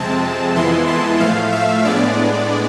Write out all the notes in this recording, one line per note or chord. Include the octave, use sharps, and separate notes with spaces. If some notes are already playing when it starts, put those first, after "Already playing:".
Already playing: F2 C3 G#3 C4 A5
F2 E3 G#3 B3 E4 C6
A5
A2 F3 A3 F5
E5
A2 G#3 B3 D4 D5